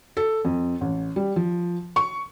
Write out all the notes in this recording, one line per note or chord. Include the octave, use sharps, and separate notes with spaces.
A4
F2
A1
G3
F3
C#6